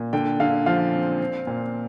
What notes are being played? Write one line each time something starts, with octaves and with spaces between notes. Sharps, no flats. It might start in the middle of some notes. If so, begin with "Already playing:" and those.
Already playing: A#2
D3 G5
D3 F5
F3 F5
C4
C4
A#2